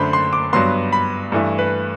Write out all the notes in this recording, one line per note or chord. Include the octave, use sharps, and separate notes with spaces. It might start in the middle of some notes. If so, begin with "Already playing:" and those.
Already playing: F#2 D3 A3 D4 C5 B5
C6
D6
G2 F#3 B3 C6
B5
G2 E3 A3
B4